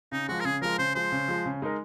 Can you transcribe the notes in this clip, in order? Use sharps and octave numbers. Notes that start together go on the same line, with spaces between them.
C#3 D#4
F3 G#3 F#4
A#4
C#3 G#4
F3 G#3 A#4
C#3 C5
F3 G#3 C5
C#3
F3 G#3
C#3
G#3 D#4 A#4